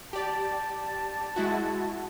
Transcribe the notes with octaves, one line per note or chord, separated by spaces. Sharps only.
G4 D5 A5
G#3 E4 F#4